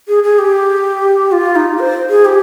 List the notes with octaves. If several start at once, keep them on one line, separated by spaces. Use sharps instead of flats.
G#4
G#4
G4
F4
D#4
C5
G#4
G4